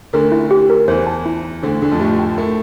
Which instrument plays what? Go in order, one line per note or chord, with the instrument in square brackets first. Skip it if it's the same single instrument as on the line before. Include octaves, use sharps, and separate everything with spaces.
[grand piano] D2 D3 [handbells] A#4
[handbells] E4
G4
A#4
[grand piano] E2 E3 [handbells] C5
[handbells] A5
E4
E4
[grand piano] D2 D3 [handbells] C5
[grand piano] D2 D3 [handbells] D4
[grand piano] F2 F3
[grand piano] A2 A3 [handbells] G4
[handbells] G5
[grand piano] A2 A3 [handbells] A#4